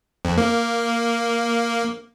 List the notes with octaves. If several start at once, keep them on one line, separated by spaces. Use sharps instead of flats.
F2
A#3